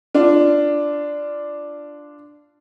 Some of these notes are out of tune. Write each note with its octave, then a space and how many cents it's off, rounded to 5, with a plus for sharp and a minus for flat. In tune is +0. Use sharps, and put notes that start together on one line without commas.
D4 +0 F4 -20